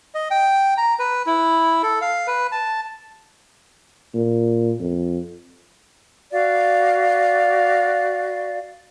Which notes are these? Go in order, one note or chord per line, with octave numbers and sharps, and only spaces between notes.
D#5
G5
A#5
B4
E4
A4
F5
B4
A5
A#2
F2
F#4 D5 F5